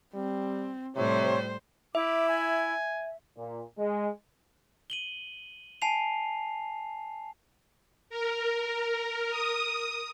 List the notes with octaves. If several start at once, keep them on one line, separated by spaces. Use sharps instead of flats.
G3 C4
A2 C3 G3 C5 C#5
E4 E5 D6
G#5
A#2
G#3
D#7 F#7 G7
G#5 A5 C7 F7
A#4
D#6